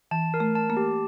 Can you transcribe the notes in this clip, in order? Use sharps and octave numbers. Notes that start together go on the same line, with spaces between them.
E3 A5
A#4
A3
A5
A#3
G4